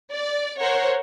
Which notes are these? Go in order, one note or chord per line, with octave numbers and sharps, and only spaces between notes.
D5
A#4 C5 C#5 F#5